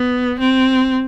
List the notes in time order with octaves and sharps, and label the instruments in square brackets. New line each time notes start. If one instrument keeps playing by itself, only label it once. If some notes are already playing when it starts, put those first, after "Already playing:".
Already playing: [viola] B3
C4